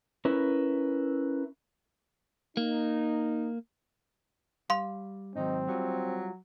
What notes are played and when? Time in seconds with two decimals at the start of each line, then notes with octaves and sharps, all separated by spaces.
0.25 C#4 E4 A#4 B4
2.57 A#3 D#4
4.70 G3 F5 C6
5.36 G#2 D#3 F#3 C4 D#4
5.68 F#3 G3 F4